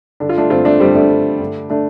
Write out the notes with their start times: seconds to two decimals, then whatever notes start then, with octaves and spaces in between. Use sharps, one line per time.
0.20 G2 D3 D4
0.29 F4
0.37 A3 D4
0.50 G2 D3 C4 F4
0.65 A3 D4
0.80 G2 D3 G3 C4
0.95 A3 D4
1.10 G2 D3
1.40 G2 D3
1.70 D3 A3 D4